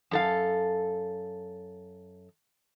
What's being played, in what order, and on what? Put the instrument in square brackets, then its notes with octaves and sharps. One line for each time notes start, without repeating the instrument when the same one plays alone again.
[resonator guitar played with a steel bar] F#2 A4 F5